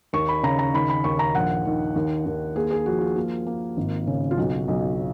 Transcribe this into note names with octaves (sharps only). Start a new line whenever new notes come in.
D#2 C#6
B5
C#3 A#5
A#5
D#3 B5
B5
D#2 C#6
A#5
A#1 F#5
D#3
D#2
D#2
A#3 G#4
G#4
F3 F#4
F4
A#3 F4
A#3
G#1
C#3
F4
B1 F#4
B1